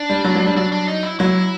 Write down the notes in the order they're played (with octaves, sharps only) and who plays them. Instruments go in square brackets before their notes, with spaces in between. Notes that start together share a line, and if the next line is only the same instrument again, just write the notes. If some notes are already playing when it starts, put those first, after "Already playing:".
Already playing: [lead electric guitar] D4
[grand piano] G3
F#3
F#3
G3
[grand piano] F#3 [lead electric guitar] D4
[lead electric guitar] D4
D#4
E4
[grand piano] F#3 [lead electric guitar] E4